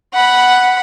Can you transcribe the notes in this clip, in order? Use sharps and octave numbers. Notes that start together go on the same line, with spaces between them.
F#5 B5